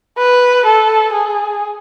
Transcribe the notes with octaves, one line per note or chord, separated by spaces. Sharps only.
B4
A4
G#4